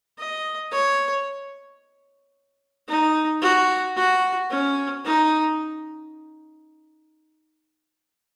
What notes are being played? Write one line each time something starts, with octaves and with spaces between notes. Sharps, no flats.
D#5
C#5
D#4
F#4
F#4
C#4
D#4